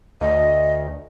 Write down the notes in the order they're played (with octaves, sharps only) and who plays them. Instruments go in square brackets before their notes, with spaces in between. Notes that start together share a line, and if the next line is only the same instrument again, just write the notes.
[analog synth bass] D2 [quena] D#5